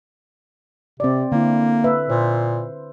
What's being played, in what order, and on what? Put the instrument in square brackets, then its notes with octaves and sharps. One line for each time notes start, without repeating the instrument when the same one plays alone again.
[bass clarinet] C3 [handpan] C4 D5
[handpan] D3 E4 [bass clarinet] A#3
[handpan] B4 E5
[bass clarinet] A#2 [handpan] C5